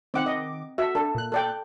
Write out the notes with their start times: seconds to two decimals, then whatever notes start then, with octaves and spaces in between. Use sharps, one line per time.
0.14 D#3 C4 F#5 D6
0.26 D#5
0.78 F#4 A4 E5
0.95 D4 A4
1.15 A#2 F#6
1.32 A4 D5 G5